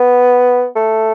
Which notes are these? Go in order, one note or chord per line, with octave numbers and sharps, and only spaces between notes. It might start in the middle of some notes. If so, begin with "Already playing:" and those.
Already playing: B3
A3